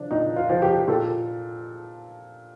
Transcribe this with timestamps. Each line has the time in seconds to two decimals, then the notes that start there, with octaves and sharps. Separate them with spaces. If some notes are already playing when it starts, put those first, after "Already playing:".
Already playing: F3 D4
0.11 A#2 D#4
0.36 F4
0.50 F3
0.62 G4
0.88 A#2 A4